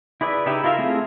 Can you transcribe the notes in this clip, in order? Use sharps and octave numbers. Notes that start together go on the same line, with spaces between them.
E4 G#4 B4 D5 E5
C#3 D#4 E4 G4 E5
E4 F4 A#4 E5 F5
A3 C4 E4 G#4